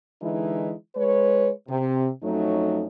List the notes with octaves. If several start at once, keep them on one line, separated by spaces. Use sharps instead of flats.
D3 E3 G#3 D#4 E4
G#3 B4 C#5
C3
F2 F#3 A3 C#4 D#4